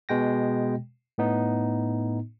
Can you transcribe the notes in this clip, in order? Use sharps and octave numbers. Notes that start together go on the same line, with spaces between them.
B2 G#3 G5 A#6
A2 B3 D#4